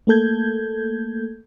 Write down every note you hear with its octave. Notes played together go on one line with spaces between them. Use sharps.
A3 A#3 A4 G6 G#6